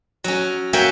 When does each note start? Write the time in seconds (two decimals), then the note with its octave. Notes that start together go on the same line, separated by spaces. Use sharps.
0.24 F#3 C#4
0.73 A#3 F#4 C#5 E5 G5 G#5